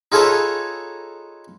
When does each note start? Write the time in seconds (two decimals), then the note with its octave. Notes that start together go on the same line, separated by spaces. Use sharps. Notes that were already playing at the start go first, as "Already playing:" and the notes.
0.12 D#4 F4 G#4 A4 B4 C#5